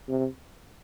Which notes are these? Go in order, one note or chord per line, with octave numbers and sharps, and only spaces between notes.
C3